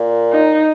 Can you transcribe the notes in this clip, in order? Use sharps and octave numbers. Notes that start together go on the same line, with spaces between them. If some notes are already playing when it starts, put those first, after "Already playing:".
Already playing: A#2
D#4